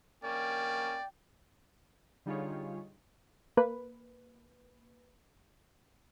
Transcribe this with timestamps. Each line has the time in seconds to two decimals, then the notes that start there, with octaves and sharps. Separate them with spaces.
0.24 A#3 C#4 D5 G5
2.26 D3 G3 D#4 F4 G#4 C#5
3.57 A#3 B4